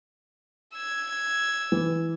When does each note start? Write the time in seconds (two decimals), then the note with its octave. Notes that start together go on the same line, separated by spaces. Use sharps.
0.74 E6 G#6
1.72 E3